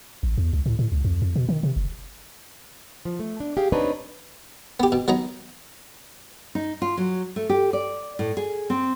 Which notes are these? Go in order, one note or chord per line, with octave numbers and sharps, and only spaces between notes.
A1
E2
C#2
A2
A2
C#2
F2
F2
B2
D#3
C3
F#1
F3
A3
D4
G4 G#4 F5
C4 D4 D#4 B4 C#5
B3 G4
B2
F#3 B3 D#4 A#5
D#4
F4
F#3
A3
G4
D5
A2
G#4
C4